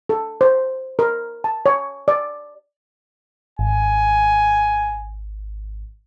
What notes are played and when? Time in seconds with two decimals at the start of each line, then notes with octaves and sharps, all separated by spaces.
0.09 A4
0.41 C5
0.99 A#4
1.44 A5
1.66 C#5
2.08 D5
3.59 G#1 G#5